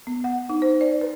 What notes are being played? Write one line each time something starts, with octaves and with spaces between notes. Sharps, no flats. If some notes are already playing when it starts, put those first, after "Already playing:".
B3
F#5
D#4
C5
D5
B4